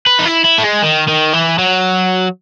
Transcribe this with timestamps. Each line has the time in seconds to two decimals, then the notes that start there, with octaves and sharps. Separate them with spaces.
0.07 B4
0.19 D#4
0.25 E4
0.45 E4
0.59 A3
0.64 G#3
0.83 D#3
1.08 D#3
1.33 E3
1.58 F#3